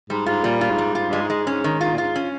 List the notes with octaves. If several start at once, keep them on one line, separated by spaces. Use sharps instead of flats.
G#2 G3
G#2 F4
A#2 G3
F4
G#2
G3
G#2 F4
G2 G#3
G#2
G#3
G#2 C#4
D#3
F4
A#2
G#2 F4
C#4